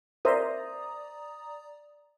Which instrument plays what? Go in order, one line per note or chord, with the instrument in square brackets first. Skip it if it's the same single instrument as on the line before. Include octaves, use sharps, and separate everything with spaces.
[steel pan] A#4 C5 E5 [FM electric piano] D5 A#5 D#6